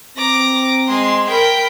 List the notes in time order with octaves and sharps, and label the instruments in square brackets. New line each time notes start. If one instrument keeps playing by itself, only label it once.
[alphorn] C4 [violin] A#5 D6
[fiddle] G#3 [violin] C6
[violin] A#4 [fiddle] G5 B5